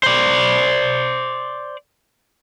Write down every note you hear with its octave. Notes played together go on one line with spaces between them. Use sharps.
C5 D5